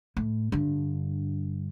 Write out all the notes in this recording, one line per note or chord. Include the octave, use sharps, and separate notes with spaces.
A2
G2 D3